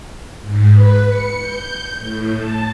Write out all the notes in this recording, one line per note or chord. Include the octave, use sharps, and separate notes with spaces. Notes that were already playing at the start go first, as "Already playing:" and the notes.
G#2
B4
C#7
G6
A2
A5